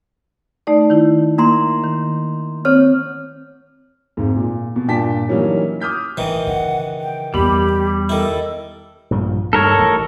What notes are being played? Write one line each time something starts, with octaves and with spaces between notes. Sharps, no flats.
A3 D#4 D5
D#3 E4
A#3 A#5 C6
D#3
C4 C#5 F6
G#1 G#2
A#2
B2
G2 A#2 D4 G5 A5 B6
E3 F#3 G3 A#3 C#4 D#4
D6 D#6 F6 G6 B6
A1 D#3 E3
C#3 F#5
G5
E2 G3 B3 G4 B5
D#3 E4 A4
A#1 G2 F3
G2 D#3 A4 A#4 C#5
A1